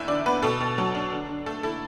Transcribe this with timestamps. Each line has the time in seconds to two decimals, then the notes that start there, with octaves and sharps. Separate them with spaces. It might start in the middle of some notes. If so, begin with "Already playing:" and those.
Already playing: E2 D4 E4 E5
0.08 D3 D5
0.26 B3 B4
0.42 B2 A4
0.60 B2
0.78 F#3
0.95 D4
1.12 D3
1.29 D3
1.46 A3 A4
1.63 E4 A4